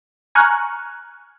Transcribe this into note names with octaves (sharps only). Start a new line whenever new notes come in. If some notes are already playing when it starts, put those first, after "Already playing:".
G#5 A#5 C#6 F6 F#6